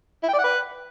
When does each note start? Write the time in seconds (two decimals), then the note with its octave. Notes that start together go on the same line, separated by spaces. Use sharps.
0.23 E4
0.28 G5
0.33 D5
0.39 F#5
0.44 B4